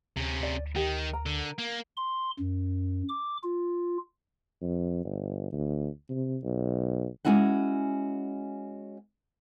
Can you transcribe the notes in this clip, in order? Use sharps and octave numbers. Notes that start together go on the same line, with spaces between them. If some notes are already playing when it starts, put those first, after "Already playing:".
D2 C3 C#4
D5
D#3 G4
A#4 A#5
D3
A#3
C6
F#2
D6
F4
F2
G1
D2
C3
B1
G#3 A3 C#4 E4 F#4 F#5